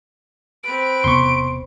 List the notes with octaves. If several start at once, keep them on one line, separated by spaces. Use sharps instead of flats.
C4 B4 D7
E1 C3 B3 C6 C#6